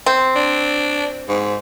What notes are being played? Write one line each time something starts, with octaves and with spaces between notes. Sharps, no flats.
C4
D4
G#2